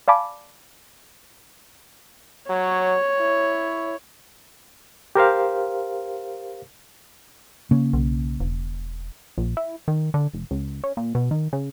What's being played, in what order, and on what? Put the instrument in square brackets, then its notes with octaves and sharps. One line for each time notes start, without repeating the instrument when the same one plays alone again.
[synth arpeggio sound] D5 F5 G#5 A5 B5 D6
[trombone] F#3 [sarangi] C#5
[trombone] E4
[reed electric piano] G4 A#4 C5 F5
[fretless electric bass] C#3 A#3 C#4
[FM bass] B1
E1
[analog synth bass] A#1
E4
D#3
D3
F1
C#2
C#4
A#2
B2
D#3
C#3